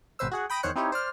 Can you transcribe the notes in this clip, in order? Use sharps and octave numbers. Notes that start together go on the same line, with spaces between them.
G#1 B2 B4 C5 E6
F#4 G#4 F#5
G5 B5 D#6 A#6 D7
E2 D#3 C5 C#5 F#6 C#7
C4 D#4 E4 G4 C#5
C5 D5 F6